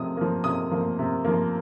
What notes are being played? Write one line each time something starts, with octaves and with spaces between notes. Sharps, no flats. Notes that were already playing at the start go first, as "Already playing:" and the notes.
Already playing: C3 F3 A#3 D#6
F3 A#3
C3 D#6
F3 A#3
C3
F3 A#3